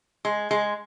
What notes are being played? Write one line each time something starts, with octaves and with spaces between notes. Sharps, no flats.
G#3
G#3